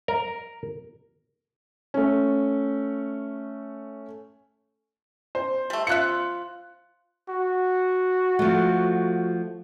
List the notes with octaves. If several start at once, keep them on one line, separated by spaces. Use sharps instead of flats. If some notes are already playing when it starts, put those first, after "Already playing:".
A#4
A3 C#4
C5
G3 A3
F3 F4 E5 F#6 C#7
F#4
F3 A3